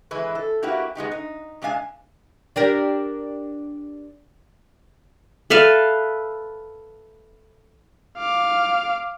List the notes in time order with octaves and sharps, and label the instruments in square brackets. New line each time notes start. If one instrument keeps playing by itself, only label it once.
[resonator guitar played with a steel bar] E3 G#3 E4 B4
A4
A#3 E4 F#4 G4 B4
G#3 B3 D#4 G4
D#4
C3 G#3 D4 F5 G#5
[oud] D4 G4 A#4
[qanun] A4 B4 E5 F5
[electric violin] F5 D6